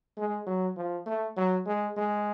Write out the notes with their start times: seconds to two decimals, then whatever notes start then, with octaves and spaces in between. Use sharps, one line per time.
0.17 G#3
0.47 F#3
0.76 F3
1.06 A3
1.37 F#3
1.66 G#3
1.97 G#3